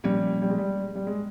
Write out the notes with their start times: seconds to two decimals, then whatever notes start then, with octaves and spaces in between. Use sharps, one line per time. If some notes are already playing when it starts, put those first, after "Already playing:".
0.04 A#2 F3 G3 A#3 C#4
0.42 G3
0.50 G#3
0.58 G3
0.95 G3
1.07 G#3